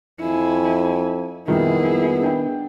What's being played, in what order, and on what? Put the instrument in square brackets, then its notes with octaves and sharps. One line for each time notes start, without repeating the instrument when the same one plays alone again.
[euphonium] F2 [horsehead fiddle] E4 G#5
[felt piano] A#1 F2 G3 [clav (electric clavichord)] D#3 [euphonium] B3 [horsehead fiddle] E4 G#4
[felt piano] D4 G5